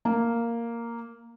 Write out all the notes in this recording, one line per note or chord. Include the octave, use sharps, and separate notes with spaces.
A#3